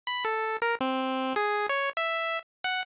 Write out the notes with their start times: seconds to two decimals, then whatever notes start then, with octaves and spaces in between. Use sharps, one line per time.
0.07 B5
0.25 A4
0.62 A#4
0.81 C4
1.36 G#4
1.69 C#5
1.97 E5
2.64 F#5